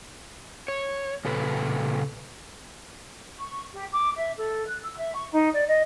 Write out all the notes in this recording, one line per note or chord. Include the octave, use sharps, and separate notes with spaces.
C#5
A#2 C#3 A4 B4
C#6
G4
D6
E5
A4
F#6
E6
E5
C#6
D#4
D5
D#5